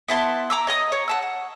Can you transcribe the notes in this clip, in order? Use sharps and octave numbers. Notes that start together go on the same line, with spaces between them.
B3 E4 A5 C6
A#5 D6 E6
C#5 D#5 D#6
C#5
F#5 A5 E6
F#5